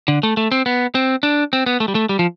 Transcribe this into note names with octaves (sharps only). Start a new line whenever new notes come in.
D3
A3
A3
C4
B3
C4
D4
C4
B3
A3
G3
A3
G3
F3